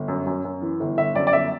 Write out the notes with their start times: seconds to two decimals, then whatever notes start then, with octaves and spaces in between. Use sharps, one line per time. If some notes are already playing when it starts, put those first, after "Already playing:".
Already playing: G1
0.08 F#2
0.26 F#2
0.45 F#2
0.62 E3
0.80 G1
0.97 G1 E5
1.15 F#2 D5
1.27 D5
1.33 G1 E5